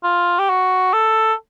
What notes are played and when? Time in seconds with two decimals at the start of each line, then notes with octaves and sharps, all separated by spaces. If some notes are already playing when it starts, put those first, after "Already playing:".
0.03 F4
0.39 G4
0.49 F#4
0.93 A4